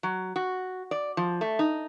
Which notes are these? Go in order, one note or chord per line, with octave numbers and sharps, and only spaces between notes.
F#3
F#4
D5
F3
A3
D#4